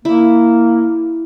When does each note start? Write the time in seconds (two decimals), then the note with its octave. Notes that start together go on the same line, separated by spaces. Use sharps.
0.05 A#3 E4